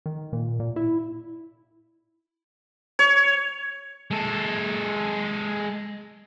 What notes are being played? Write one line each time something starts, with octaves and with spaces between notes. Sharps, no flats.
D#3
A#2
A#2
E4
C#5
G#3 A4